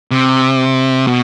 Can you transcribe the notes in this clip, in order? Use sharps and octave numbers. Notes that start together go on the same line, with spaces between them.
C3
B2